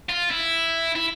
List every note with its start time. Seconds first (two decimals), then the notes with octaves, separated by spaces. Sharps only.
0.09 F4
0.31 E4
0.95 E4